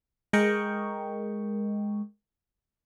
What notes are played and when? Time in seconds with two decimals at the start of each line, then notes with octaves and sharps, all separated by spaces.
0.33 G#3 A#4 D#5 G5 C#6